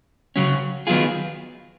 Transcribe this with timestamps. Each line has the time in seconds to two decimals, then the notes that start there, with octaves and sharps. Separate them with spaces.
0.36 C#3 F#3 C#4
0.87 D#3 F#3 B3 F4 G#4